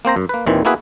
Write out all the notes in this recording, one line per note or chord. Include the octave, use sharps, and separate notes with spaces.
A#3 C4 C5 A#5
F#2
A#3 B4
D#2 A#2 D#3 E3 C4
A#3 B3 E4 F#4 G#4 B4